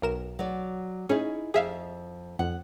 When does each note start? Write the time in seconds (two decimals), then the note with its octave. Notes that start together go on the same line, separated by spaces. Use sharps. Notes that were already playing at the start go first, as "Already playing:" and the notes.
0.02 B1 A#4 E7
0.39 F#3 D5
1.09 C#4 D#4 E4 G#4
1.54 F2 G#4 E5 F5
2.39 F2 F#5